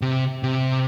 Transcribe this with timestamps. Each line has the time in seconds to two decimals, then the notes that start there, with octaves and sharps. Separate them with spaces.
0.02 C3
0.43 C3